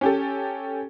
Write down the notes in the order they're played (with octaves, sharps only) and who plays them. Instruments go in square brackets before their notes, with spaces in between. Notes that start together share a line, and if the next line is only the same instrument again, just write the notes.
[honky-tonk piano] C#4 G4 A4